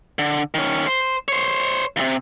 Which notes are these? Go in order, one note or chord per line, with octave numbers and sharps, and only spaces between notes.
D3
D#3 C#4
C5
C5 C#5
D#2 C3